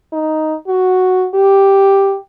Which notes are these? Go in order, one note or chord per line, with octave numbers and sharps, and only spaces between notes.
D#4
F#4
G4